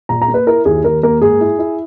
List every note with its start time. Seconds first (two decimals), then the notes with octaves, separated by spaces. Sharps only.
0.09 A#2 A#5
0.22 A#5
0.28 A#3
0.34 B4
0.47 E4 A#4
0.65 D#2 G#4
0.84 D#2 A#4
1.03 A#3 A#4
1.21 G#2 G#4
1.41 E4
1.59 E4